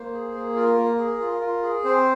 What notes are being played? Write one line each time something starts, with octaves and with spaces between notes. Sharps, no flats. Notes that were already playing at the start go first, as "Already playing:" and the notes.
Already playing: A#3 C5
G#4
A#3
F4 A#4
A#3
G#4
F4
F4
G#4
C4 C5